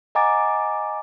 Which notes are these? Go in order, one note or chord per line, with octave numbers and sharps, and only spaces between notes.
D#5 F#5 G#5 A#5 D6 A6